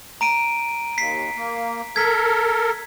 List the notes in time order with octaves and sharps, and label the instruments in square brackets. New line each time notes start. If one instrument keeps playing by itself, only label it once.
[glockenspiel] A#5 D7 D#7
[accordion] D#2 [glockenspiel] B6 C7
[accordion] A#3
[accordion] A4 A#4 [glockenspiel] G#6 B6